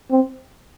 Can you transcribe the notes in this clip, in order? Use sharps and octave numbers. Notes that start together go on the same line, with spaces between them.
C4